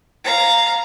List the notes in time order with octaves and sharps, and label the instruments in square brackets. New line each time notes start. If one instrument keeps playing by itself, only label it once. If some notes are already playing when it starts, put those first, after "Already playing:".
[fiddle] F5 A#5